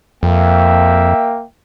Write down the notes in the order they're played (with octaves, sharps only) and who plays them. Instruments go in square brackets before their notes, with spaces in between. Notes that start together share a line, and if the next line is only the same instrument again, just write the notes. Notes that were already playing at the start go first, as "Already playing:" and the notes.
[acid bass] F2 [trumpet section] A#3 E5 G5